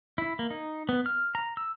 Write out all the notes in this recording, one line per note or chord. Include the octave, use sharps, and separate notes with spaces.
E4
A#3
D#4
B3
F6
A#5
E6